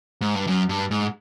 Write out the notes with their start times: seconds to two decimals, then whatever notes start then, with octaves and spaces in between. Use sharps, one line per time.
0.21 G#2
0.35 G2
0.47 F#2
0.69 G2
0.91 G#2